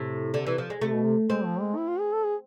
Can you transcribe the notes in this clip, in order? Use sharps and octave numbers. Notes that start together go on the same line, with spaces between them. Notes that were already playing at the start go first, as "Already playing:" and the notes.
Already playing: A2 C3
D3
E3
F3
G#3
C3 A3
B2
C3
G#3 C4
F3
G#3
E4
F4
G#4
A4
G#4